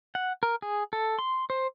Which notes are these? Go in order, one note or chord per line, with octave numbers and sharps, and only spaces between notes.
F#5
A#4
G#4
A4
C6
C5